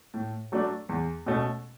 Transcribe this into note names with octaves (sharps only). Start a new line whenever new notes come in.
A2
F#3 A3 D4
E2
B2 A3 C#4